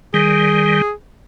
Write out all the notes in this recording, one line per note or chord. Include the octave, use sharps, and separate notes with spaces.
D#3 G3 G#4